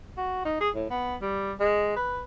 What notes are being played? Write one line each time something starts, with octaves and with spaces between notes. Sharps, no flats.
F#4
D#4
G#4
A2
B3
G3
G#3
B4